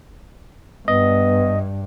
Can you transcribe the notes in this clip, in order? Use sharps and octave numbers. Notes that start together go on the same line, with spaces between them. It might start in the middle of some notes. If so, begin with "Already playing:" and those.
G2 B3 D#5